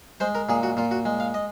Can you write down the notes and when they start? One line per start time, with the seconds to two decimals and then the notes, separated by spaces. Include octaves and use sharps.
0.20 G#3 C5
0.35 A#4
0.49 A#2 G#4
0.63 F#4
0.77 A#2 F4
0.91 F#4
1.05 G#3
1.20 F5
1.34 D#5